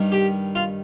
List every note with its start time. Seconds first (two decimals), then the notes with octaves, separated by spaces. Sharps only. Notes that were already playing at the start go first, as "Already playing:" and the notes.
Already playing: G2 D#3
0.12 G4
0.55 F4